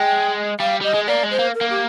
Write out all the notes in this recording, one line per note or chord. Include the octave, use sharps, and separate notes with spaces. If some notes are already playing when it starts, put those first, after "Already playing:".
Already playing: G#3 G5
G3 F5
G3 D#5
G#3
A#3 D5
G#3
C5
A#3
A#4
A#3
G4